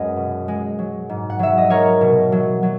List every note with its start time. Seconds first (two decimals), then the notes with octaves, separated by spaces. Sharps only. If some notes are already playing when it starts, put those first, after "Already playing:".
Already playing: F#2 G#3 B4 D#5 F#5
0.17 B2
0.48 G#3
0.79 F#3
1.09 G#2
1.30 F#5
1.39 F#3 E5
1.58 D#5
1.70 F#3 A#4 C#5
2.01 B2
2.32 F#3
2.63 F#3